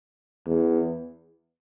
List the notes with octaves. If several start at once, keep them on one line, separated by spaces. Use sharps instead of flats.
E2